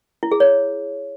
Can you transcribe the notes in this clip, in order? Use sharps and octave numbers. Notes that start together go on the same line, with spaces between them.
E4
G#4
C#5